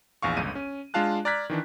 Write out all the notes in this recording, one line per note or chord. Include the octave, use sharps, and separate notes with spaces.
A#1 E2 F5 C#6
G1 C#2 D#7
C#4
G#3 D4 F4 F5 A5 F#6
D5 A#5 F6 F#6 G#6 B6
D#3 E3 D4